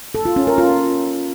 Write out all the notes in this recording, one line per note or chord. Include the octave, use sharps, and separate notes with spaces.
A4
F4
C#4
A#4
F4